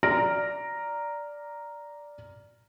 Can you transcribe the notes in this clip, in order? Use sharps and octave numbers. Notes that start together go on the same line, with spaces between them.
D5 A#5 F6 A#6 D7